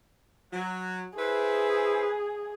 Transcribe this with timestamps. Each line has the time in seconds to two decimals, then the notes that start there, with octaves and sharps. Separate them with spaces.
0.52 F#3
1.18 E4 G#4 B4 C5